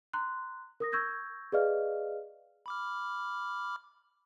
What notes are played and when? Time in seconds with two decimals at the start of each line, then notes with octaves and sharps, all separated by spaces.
0.13 A#5 C6 F#6
0.80 A#4 D#6 A#6
0.92 C#6 E6 G6 G#6 A#6
1.52 G#4 B4 D5 D#5 F5 F6
2.66 B5 D6 F6